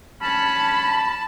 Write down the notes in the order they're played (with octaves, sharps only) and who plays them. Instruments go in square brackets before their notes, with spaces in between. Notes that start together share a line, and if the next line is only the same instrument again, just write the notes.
[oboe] C#4 [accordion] A5 [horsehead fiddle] B5